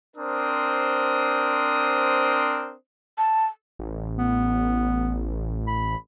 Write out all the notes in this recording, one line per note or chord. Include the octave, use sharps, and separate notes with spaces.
C4 D4 A#4 C5 D#6
A5
A1
B3
B5